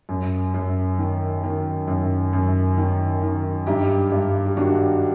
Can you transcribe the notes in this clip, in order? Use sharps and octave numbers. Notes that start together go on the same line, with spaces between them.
F#2
F#2
D#3
D#3
F#2
F#2
D#3
D#3
G2 D#4 G4
G2
G4
D#3 D4 F#4